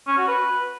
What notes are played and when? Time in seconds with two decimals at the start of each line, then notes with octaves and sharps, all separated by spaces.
0.07 C#4
0.17 F#4
0.28 B4